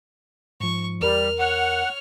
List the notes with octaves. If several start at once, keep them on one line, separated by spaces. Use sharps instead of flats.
G#2 F3 C#6
E2 G3 A#4 F6
C#5 F#5 F6